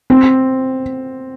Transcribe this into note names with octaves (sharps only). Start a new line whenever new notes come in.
C4